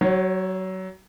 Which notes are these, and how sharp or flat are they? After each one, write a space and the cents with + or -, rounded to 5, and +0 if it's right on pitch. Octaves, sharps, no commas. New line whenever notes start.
F#3 +25 C#5 -25